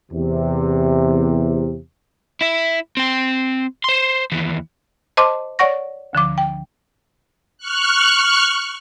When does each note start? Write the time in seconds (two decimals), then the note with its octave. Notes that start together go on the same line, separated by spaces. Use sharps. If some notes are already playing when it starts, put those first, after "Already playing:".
0.11 E2 C3
2.41 E4 E5
2.97 C4 G5
3.84 C5 C6
4.32 D#2 E3
5.17 C5 D#5 A5 C6 D6
5.59 C#5 D5 F#5 C#6 A#6
6.13 D2 D3 F3 D6
6.38 G5
7.58 C#6 F6 F#6